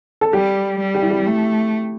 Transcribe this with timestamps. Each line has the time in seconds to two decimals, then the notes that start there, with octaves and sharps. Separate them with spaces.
0.21 A4
0.33 G3 G4
0.79 G3
0.95 G4
1.02 E4
1.11 G4
1.26 A3